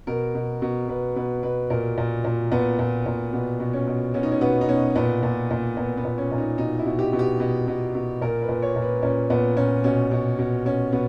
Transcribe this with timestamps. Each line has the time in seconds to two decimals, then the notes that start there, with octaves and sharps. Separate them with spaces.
0.07 B2 A#4
0.35 B2
0.62 B2
0.88 B2 B4
1.16 B2 B4
1.43 B2 B4
1.70 A#2 A#4
1.98 A#2
2.24 A#2
2.52 A#2 B3
2.79 A#2
3.06 A#2
3.33 B2 B3
3.60 B2
3.73 C#4
3.87 B2
4.14 B2 C#4
4.23 D#4
4.32 C#4
4.41 B2 B3
4.61 D#4
4.69 B2 C#4
4.95 A#2 B3
5.23 A#2
5.51 A#2
5.77 A#2 B3
5.97 B3
6.05 A#2
6.18 C#4
6.32 A#2
6.38 D#4
6.58 B2 D#4
6.79 E4
6.86 B2
6.99 G4
7.13 B2
7.19 G4
7.40 B2
7.68 B2
7.95 B2
8.21 A#2 A#4
8.42 B4
8.49 A#2
8.62 C#5
8.76 A#2
8.82 B4
9.03 A#2 C#4
9.30 A#2 B3
9.57 A#2 C#4
9.84 B2 C#4
10.11 B2
10.39 B2
10.65 B2 C#4
10.92 B2 B3